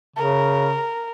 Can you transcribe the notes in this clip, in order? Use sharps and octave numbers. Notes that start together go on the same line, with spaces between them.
C#3 A#4